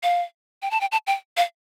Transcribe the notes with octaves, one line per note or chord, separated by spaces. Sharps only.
F5
G5
A5
G5
A5
G5
F5